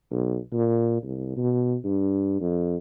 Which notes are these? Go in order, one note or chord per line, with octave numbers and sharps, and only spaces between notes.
B1
A#2
C2
B2
G2
F2